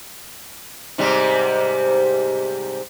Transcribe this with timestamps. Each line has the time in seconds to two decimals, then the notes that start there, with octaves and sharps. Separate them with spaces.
0.98 G#2 C3 G3